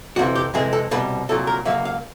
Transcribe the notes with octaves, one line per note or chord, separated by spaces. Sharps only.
F2 C3 E3 F#4
G4
F2 C3 E3 G#3 G#4
A4
C2 B2 G3 B4
C2 A#2 F#3 A4
A#4
B2 F#3 A#3 E5
C#2
F5